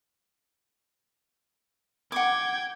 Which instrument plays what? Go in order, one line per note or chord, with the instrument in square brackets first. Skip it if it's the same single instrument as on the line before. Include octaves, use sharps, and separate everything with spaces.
[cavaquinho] F#5 D6 [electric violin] G5 G#6